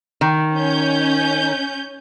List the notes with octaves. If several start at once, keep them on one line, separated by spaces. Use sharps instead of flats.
D#3
C#4 G6